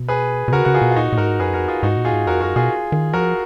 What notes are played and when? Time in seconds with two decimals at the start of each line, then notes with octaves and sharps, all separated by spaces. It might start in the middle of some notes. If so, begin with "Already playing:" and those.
Already playing: B2
0.08 G#4 B4
0.48 B2
0.52 C#3 F#4 A#4
0.65 C#3 F#4
0.74 F4 G#4
0.82 B2
0.91 F4
0.96 A#2 D#4 F#4
1.12 A#2
1.17 G#2 F#4 A#4
1.39 F#2 G#4 B4
1.53 F2 F#4 A#4
1.68 F4 G#4
1.83 G#2 D#4 F#4
1.97 A#2
2.05 F4 G#4
2.12 G#2
2.27 F2 F#4 A#4
2.41 F#2 F#4 A#4
2.56 B2 F4 G#4
2.92 D#3
3.13 F3 F#4 A#4